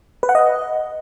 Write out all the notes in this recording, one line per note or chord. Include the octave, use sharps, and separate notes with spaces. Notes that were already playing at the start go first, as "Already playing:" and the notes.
B4
F#5
D#5